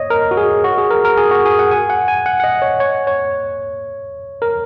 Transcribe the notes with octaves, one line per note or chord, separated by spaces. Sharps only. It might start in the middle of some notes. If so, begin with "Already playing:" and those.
Already playing: C#5 D#5
A#4
F#4
G#4
F#4
G#4
A#4
A#4
G#4
F#4
G#4
F#5
G#5
F#5
G#5
F#5
F#5
D#5
C#5
C#5
C#5
A#4